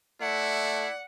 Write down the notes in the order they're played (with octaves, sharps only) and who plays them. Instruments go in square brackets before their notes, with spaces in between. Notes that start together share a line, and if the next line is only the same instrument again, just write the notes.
[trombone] A3 [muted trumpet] E4 [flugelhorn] D5 [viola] F#5